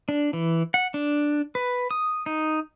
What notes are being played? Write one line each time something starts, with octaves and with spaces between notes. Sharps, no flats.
D4
E3
F#5
D4
B4
D#6
D#4